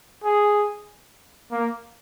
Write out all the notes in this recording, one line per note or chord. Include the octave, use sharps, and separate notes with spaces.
G#4
A#3